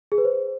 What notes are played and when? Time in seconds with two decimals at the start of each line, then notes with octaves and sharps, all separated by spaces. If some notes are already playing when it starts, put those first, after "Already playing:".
0.12 G#4
0.18 B4
0.24 C5